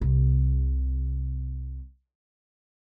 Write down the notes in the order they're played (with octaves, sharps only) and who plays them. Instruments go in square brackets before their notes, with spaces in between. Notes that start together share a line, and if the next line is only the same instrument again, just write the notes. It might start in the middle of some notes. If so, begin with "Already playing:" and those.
[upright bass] C2 C3